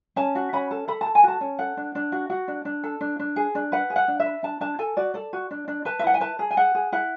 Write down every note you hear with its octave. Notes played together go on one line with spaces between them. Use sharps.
C#4 A5
F#4
C#4 B5
A4
A4 B5
A5
A4
G#5
F#4 A5
C#4
A4 F#5
D4
D4
F#4
F#4
D4
D4
A4
D4
D4
G#4
D4
B4 F#5
G#4
F#5
D4
E5
B4
D4 A5
D4 A5
A4 G#5
F#4 D5
A4 D5
F#4
D4
D4
B4 A5
E5
E4 F#5
G#5
B4 A5
G#4
G#5
G#4 F#5
G#4
E4 F#5